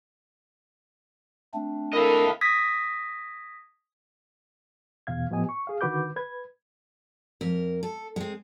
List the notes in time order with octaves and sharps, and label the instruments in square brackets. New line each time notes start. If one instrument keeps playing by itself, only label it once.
[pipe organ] A3 C4 D4
[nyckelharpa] E4 A4 [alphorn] A#4 [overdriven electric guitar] D#5 F5
[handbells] D#6 G#6 A#6 B6
[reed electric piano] E2 B2 F5 G#6
A2 F3 B3 G4 D#5 G#5
C#6
G#4 F5
D3 D#3 F#4 B4 D6 G6
B4 G#6
[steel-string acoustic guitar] F2 A#4
A4
G#3 C4